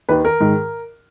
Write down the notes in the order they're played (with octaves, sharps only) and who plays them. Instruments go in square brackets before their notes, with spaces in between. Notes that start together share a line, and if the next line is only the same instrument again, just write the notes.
[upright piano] D#2 D#3 B4
A#4
G#2 D#3